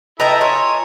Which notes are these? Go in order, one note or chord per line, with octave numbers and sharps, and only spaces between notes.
E4 A4 B4 D#5 G5 A#5
F4 C#5 G#5